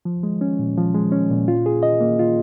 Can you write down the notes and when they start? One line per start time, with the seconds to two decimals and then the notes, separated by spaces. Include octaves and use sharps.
0.05 F3
0.23 G#3
0.41 C#4
0.59 A#2
0.77 F3
0.94 G#3
1.12 C#4
1.30 A#2
1.48 F4
1.66 G#4
1.83 D#5
2.01 A#3
2.19 F4